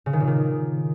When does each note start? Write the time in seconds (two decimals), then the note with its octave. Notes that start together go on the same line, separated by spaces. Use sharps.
0.06 C#3
0.13 D#3
0.20 A#2
0.27 D#3